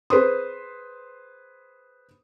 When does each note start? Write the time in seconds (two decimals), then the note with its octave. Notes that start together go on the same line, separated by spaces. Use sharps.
0.10 G#4 B4 C5 C6 D#6